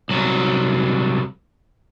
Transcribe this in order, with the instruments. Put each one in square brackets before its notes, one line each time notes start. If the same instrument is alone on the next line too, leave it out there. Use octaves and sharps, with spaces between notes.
[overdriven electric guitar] C2 F#3